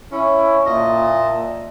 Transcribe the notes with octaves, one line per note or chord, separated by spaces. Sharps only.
C#4 E4
A#2 D#5 E5 A5